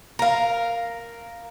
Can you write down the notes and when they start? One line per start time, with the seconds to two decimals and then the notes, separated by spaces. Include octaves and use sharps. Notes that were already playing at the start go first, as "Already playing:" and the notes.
0.19 A#4 F5